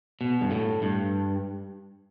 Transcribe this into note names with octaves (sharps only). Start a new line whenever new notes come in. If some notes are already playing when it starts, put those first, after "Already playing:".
B2
G2
A2
G2